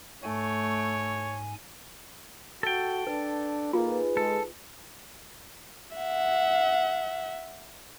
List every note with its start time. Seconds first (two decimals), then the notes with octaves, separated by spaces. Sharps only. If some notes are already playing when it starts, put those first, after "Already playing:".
0.23 G#2 A3 C#5 G#5
2.63 F#4 A4 G5
3.07 D4 B4
3.73 A#3 D#4 F4 G#4 B4
4.17 G#3 A4
5.97 E5 F#5